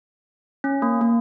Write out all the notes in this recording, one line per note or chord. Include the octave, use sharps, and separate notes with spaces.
C#4
A#3
A#3